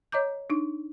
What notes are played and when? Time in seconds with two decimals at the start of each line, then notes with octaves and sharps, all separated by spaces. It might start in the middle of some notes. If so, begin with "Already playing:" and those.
0.12 C#5 D#5 A#5 D6 G6
0.50 D4 D#4